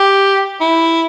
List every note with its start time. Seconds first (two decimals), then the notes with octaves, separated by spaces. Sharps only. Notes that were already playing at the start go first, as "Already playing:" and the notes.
Already playing: G4
0.60 E4